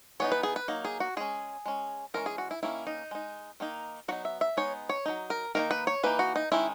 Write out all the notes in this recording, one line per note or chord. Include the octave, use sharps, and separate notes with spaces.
E3 B3 D#4 C#5
B4
G#4
B4
F#3 A#3 D#4
G#4
F#4
G#3 C#4 G#4
G#3 C#4
E3 G#3 C#4 A#4
G#4
F#4
E4
D#3 A#3 C#4 E4
D#4
G#3 D#4
D#3 A#3 D#4
F#3 B3 D#4 F#4
E5
E5
G#3 B3 D#4 C#5
C#5
F#3 A#3 D#4
A#4
D#3 A#3 D#4 A#4
B4
C#5
E3 A#3 D#4 B4
F#4
D#4
D#3 G#3 C#4 E4